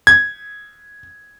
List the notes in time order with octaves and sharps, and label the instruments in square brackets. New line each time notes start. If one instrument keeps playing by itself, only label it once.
[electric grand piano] G#6